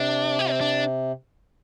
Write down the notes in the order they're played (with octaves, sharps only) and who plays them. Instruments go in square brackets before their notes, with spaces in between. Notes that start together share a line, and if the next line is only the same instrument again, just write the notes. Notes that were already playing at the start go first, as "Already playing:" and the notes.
Already playing: [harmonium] C3 [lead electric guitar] D4
[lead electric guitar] G4
C4
D4